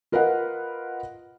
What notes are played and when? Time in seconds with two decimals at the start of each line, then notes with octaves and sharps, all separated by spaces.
0.12 F4 A#4 B4 D#5 F5 F#5